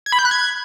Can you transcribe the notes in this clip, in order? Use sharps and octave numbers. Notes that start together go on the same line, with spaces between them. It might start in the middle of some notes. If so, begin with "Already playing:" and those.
G#6
B5
G6
F#6
G#6